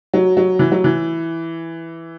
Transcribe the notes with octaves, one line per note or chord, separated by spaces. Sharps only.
F#3
F#3
E3
F#3
E3